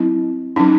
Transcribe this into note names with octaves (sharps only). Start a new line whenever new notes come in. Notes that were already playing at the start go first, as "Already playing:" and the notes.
Already playing: F#3 C4 E4
F#3 C#4 D#4